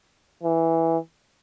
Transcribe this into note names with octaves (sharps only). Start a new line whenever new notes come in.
E3